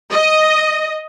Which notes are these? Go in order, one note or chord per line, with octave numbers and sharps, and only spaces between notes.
D#5